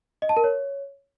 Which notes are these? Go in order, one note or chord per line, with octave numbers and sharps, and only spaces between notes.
D#5
A5
A#4
C#5